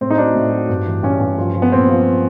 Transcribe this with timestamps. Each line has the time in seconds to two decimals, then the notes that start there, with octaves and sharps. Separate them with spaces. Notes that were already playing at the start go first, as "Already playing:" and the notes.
0.01 A2 C4
0.10 D#4
0.18 F#3 D4
0.35 A2
0.52 F#3
0.69 G2
0.87 E3
1.03 G2 C#4
1.20 G2
1.38 F3
1.55 F3
1.62 B3
1.72 A#2 C4
1.89 F3